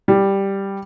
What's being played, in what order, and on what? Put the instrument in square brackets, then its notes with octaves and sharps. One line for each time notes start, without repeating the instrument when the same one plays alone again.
[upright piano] G3